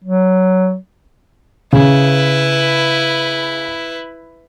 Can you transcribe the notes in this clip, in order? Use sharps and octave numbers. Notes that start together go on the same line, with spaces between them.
F#3
C#3 E4 B4